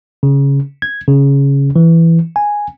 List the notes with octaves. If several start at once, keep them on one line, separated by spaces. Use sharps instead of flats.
C#3
G#6
C#3
E3
G#5